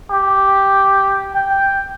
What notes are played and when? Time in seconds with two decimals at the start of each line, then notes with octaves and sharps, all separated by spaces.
0.11 G4
1.34 G5